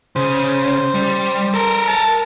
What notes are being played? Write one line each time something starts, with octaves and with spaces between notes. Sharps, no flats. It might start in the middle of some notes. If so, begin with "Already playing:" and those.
C#3 C5
G3
A4 A#4
A5